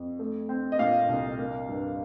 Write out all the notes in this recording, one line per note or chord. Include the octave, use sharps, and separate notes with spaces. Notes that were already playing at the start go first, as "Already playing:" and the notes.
Already playing: F2
A3
C4
D#5
A#2 F5
C2
A#3
G2